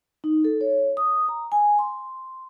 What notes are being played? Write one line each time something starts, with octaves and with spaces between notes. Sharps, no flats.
D#4
A4
C#5
D#6
A#5
G#5
C6